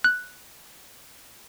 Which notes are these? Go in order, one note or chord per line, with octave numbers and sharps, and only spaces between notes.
F#6